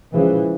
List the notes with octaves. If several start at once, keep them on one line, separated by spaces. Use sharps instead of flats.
C#3 E3 F3 G#3